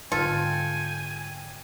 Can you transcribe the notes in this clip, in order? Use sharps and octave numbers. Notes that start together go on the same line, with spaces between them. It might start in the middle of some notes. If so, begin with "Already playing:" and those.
G#2 D3 G3 F4 A4 G5 G#5